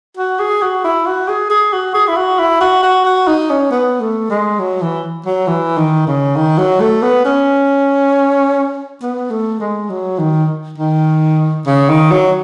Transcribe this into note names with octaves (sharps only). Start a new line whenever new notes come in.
F#4
G#4
F#4
E4
F#4
G#4
G#4
F#4
G#4
E4
F#4
E4
F#4
F#4
F#4
D#4
C#4
B3
A3
G#3
F#3
E3
F#3
E3
D#3
C#3
D#3
F#3
A3
B3
C#4
B3
A3
G#3
F#3
D#3
D#3
C#3
D#3
F#3